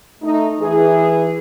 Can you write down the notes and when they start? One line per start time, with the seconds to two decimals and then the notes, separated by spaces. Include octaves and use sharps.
0.22 A3 D#4
0.61 E3 G#4